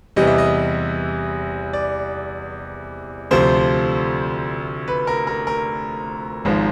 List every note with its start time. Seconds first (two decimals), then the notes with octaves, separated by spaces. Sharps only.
0.16 E2 C3 E3 G3 D#5
0.27 E5
0.38 D#5
1.73 D5
3.31 D2 C3 F3 C5
4.88 B4
5.07 A#4
5.27 A#4
5.47 A#4
6.45 G#1 G#2 F3